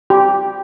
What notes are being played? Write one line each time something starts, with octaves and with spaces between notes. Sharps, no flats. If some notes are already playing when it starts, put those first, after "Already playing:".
G4